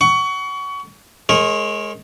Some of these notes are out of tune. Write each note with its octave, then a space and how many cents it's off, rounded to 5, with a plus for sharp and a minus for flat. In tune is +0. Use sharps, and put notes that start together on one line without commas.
F#5 +30 C#6 +25
G#3 +20 A#4 +0 C#5 -25